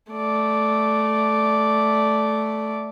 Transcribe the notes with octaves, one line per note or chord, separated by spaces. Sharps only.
A3 D5